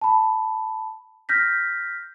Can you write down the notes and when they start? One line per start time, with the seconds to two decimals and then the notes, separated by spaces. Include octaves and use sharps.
0.02 A5 B5
1.29 F6 G6 A#6 B6